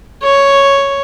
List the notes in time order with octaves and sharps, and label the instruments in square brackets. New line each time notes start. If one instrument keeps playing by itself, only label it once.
[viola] C#5